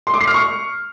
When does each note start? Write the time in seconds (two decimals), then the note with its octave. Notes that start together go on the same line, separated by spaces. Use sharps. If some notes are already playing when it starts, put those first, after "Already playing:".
0.07 C6
0.14 D6
0.21 C7
0.27 F6
0.34 C#6